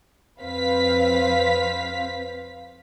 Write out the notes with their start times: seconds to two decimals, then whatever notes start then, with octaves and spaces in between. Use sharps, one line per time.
0.40 F2 C4 B4 C5 F5 B6